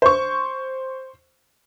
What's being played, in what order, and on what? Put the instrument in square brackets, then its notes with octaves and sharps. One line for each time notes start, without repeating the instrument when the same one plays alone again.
[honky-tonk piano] C5 C#6